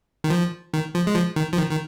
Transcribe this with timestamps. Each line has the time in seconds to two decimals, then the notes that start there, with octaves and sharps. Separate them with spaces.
0.24 D#3
0.30 F3
0.74 D#3
0.95 F3
1.07 G#3
1.15 F3
1.36 D#3
1.53 F3
1.57 D#3
1.71 D#3